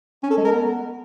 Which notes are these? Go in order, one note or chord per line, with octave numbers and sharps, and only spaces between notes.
C#4
A4
G#3
A#4
B3